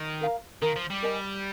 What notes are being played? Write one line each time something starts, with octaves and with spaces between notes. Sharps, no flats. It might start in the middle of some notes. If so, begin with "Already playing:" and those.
Already playing: D#3
A#4 F5 A#5
D#3 A#4 F5 A#5
F3
G3
A#4 D#5 G#5